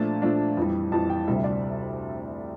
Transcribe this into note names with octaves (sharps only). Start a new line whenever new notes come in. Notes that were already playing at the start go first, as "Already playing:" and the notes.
Already playing: A#2 F3 A3 D4 A5
A#2 F3 A3 D4
F2 E3 G3
F2 E3 G3 A5
G5
D2 C3 G3 E5
D5